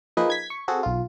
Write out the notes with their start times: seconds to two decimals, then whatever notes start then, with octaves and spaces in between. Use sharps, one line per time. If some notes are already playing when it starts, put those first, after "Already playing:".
0.17 F3 A#3 D#4 G#4 B4
0.30 G#6 B6
0.50 C#6
0.68 C4 F#4 G#4 A4
0.83 B1 F4